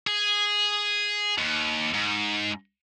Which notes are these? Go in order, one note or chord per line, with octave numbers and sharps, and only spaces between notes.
G#4
D#2
G#2